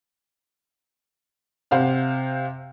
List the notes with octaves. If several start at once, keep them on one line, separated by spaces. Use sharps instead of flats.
C3 C5 F5 F#5